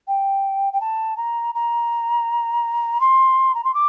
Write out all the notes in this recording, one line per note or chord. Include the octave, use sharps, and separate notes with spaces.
G5
G5
A5
A#5
A#5
C6
A#5
C6
D6